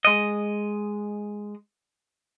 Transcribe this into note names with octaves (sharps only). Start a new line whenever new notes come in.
G#3 D#5